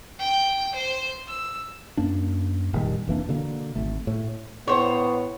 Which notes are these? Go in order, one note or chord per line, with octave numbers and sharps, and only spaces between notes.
G5
C5
E6
F#2 A#3 D4
F1 A#2 D#3 G3
F1 E3 A#3 D4
B2 D3 A#3
G#1 A3
A2
A2 B3 C5 C#5